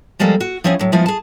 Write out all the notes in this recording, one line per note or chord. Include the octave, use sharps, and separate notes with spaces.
F3 G3 G#3 A#3 A4
F#4
F3 C4 C#4 E4 G#4
A2 F#3
F3 G#3 B3 E4 F4
G#4 A5